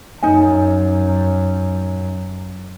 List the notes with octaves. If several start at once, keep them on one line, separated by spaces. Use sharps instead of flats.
F#2 D#4 G#5